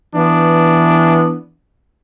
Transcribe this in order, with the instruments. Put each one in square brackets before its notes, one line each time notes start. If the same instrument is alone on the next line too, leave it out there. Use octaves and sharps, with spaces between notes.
[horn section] E3 B3 D4